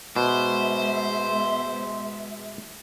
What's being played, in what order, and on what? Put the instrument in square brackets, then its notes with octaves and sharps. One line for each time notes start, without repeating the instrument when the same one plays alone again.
[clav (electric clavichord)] B2 [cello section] G#3 B3 E5 [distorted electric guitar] C5